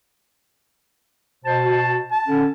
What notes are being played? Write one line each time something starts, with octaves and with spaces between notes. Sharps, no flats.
B2 C5 A5
F#4
A5
D3 C#4